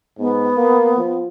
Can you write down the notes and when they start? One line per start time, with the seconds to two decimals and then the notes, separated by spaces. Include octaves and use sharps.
0.19 G#2 B3
0.56 A#3
0.97 F3